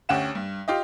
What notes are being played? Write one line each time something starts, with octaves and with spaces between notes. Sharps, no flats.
D2 C#4 G4 F#5 E7
G2
F4 G4 D#5